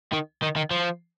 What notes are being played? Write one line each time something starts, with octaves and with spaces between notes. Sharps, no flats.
D#3
D#3
D#3
F3